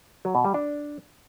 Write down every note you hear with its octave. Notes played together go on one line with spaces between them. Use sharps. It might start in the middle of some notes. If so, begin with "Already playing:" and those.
F#3
B2
G3
D4